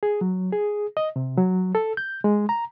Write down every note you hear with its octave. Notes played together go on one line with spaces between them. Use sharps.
G#4
F#3
G#4
D#5
C3
F#3
A4
G6
G#3
A#5